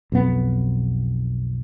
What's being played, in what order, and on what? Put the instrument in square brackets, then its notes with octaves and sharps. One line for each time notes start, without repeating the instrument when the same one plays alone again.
[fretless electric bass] B1 F2 B3